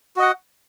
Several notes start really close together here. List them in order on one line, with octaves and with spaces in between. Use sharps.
F#4 D#5 F#5